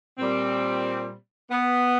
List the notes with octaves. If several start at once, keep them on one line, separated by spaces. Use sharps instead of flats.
A#2 G3 C4
B3